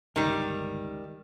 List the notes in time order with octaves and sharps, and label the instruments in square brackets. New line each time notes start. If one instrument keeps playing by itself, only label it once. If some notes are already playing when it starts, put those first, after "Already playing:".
[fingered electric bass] G1 C#2 [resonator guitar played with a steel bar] D#3 G3